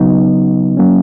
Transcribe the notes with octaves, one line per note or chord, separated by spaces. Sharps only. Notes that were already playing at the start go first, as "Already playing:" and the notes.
Already playing: C#3 F#3 B3 D#4
F#3 A#3 C#4